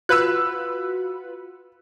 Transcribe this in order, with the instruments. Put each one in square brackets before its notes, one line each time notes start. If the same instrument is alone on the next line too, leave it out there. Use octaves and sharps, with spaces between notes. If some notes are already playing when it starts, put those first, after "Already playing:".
[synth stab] F4 B4 B5 [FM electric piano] F#4 [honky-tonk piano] E6 F#6